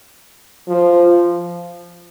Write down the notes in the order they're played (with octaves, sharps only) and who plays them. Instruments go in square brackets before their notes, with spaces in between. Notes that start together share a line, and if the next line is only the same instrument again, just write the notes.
[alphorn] F3